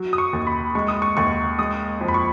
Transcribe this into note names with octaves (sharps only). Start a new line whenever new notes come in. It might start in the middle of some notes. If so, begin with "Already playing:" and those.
Already playing: F#3
D#6
C#6
D#2
B5
G#3 C#6
D#6
C#6
D#2 C#6
G#3 D#6
F2
B5
C#6